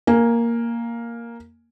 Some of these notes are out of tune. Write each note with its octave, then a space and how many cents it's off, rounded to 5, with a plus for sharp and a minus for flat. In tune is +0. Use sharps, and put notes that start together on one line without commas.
A#3 +0 G#5 +0